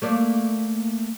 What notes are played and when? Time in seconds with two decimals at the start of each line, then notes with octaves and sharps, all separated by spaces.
0.02 A3 A#3 D5